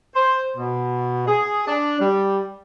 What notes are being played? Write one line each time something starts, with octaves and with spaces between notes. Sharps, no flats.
C5
B2
G#4
D4
G3